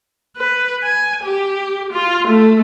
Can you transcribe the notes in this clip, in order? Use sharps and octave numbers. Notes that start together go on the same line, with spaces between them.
B4
G#5
G4
F4
A3